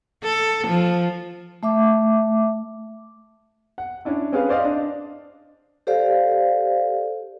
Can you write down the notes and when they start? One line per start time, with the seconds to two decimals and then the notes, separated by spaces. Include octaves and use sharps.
0.23 A4
0.67 F3
1.63 A3 E5 D6
3.78 F#5
4.05 C#4 D4 E4
4.32 C4 C#4 G#4 B4 F5
4.49 C5 D5 D#5 F5
4.65 D4
5.87 G4 A4 C5 D5 F5